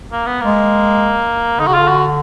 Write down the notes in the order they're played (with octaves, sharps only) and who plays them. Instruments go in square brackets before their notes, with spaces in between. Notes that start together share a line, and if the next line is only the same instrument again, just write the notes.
[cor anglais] A#3
B3
[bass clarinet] G#3 [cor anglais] A#3
[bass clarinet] D3 [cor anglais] D#4
[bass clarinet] C#3 [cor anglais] F#4
[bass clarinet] D3 [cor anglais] F4
[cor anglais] F#4